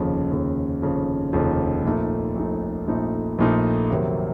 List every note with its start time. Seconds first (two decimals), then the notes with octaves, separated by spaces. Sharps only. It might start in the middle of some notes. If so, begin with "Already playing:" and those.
Already playing: F1 D#2 C#3 F3
0.31 F1 D#2 C#3 F3
0.82 F1 D#2 C#3 F3
1.33 F1 D#2 C#3 F3
1.84 A#1 A#2 A3 D#4
2.36 A#1 A#2 A3 D#4
2.88 A#1 A#2 A3 D#4
3.39 A#1 A#2 A3 D#4
3.91 F2 C3 D#3 F#3 A#3